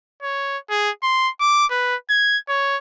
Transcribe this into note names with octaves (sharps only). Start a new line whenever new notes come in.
C#5
G#4
C6
D6
B4
G#6
C#5